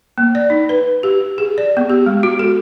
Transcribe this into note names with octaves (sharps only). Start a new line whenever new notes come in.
A#3
D5
D#4
B4
G4
G#4
D5
B3
G4
G#3
F#4
A4